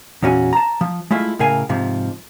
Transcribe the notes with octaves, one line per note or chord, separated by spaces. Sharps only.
E2 A#2 C#4 F#4 G#5
A5 A#5
F3
G#3 A3 E4 F4
A2 C#3 A#4 F5 G#5
G#2 C3 F3